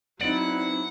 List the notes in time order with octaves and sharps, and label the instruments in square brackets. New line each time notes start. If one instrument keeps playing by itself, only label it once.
[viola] F#3 E4 [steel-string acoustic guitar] B3 C4 D#4 [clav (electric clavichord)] D5 [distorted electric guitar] F#5